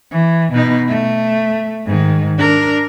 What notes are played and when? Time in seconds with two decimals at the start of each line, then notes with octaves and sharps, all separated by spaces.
0.11 E3
0.52 B2 D#4
0.88 A3
1.86 G#2 D#3
2.38 D4 A#4